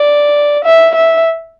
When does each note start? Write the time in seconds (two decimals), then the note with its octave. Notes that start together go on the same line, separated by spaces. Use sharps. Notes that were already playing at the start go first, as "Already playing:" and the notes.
Already playing: D5
0.65 E5
0.95 E5